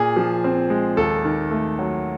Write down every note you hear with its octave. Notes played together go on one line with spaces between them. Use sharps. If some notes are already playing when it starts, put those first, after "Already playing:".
Already playing: A#2 G#4
F3
C4
G#3
D#2 A4
D#3
A3
F#3